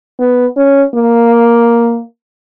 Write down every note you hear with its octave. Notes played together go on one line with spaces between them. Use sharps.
B3
C#4
A#3